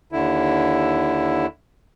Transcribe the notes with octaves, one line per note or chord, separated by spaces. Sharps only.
D#2 D3 E4